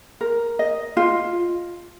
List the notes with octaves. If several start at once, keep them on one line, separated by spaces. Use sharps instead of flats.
A#4
D#5
F4